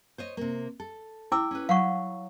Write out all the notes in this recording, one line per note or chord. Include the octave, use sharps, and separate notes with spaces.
C5 C#5 D#5
C3 A#3
A4
E4 G5 D6 E6
C#4 B4
F#3 F5 F#5 C#6